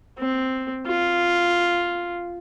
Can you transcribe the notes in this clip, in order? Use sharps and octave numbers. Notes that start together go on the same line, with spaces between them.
C4
F4